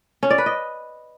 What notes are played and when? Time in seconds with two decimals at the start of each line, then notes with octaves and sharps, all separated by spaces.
0.23 C#4
0.30 D5
0.38 B4
0.46 D#5